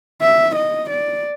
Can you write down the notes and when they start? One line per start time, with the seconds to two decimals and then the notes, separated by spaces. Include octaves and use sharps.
0.22 E5
0.56 D#5
0.91 D5